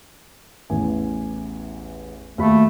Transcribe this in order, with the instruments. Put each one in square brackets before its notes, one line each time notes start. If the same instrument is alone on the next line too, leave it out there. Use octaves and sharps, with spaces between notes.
[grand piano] A1 E2 G#5
[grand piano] D#2 F#4 B5 [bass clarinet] A3